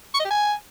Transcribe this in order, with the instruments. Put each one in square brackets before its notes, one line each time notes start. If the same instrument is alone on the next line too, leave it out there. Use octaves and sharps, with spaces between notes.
[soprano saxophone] C#6
D#5
G4
G#5